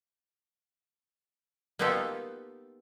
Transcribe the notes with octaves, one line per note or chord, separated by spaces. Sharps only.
A#3 B3 D#4 F4 G4 A4